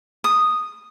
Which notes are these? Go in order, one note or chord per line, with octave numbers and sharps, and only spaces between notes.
D#6